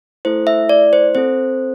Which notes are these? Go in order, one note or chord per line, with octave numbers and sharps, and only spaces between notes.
A3 E4 A4 C5
E5
D5
C5
C4 A4 C5